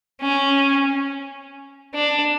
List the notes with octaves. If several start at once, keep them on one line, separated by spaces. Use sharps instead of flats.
C#4
D4